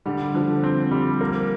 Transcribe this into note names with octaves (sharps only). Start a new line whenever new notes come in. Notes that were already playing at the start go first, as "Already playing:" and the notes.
D3 G3
D3 F3
C4
G3
A#3